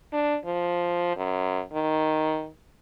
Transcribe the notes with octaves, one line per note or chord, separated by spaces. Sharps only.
D4
F3
F#2
D#3